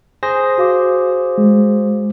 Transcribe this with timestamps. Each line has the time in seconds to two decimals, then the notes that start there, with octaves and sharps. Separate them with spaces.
0.23 G#4 C5 A#6
0.58 F#4 F5 D6
1.38 G#3